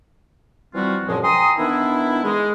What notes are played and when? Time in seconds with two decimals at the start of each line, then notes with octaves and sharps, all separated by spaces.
0.74 E3 F3 G3 C4 F4 F#4
1.07 C#2 F#2 A#2 F3 G#3
1.23 G5 G#5 A#5 C6 D#6
1.58 D#3 E3 B3 D4 E4
2.23 G#3